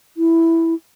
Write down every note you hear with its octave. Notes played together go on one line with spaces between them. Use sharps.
E4